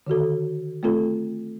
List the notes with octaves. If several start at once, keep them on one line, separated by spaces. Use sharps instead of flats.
D3 D#3 F#4 A4
A3 C4 F4 A4